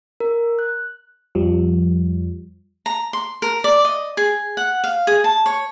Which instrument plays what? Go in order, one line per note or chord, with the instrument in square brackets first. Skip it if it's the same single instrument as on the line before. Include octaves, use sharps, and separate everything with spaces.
[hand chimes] A#4
F#6
[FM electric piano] F2 F3 G3
[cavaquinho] A#5
C6
A#4
D5
D#5
G#4
F#5
F5
G#4
A5
C#5